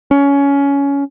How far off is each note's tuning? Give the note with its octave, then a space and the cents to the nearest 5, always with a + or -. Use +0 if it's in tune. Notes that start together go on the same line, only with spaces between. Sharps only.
C#4 +20